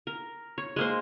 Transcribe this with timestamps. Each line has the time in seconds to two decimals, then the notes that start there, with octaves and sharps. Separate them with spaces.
0.07 A#4
0.58 C#5
0.76 G#3 A#3 C5